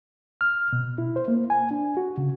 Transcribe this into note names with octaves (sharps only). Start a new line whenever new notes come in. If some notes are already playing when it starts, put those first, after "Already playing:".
F6
B2
E4
C5
A#3
G#5
D4
F#4
C#3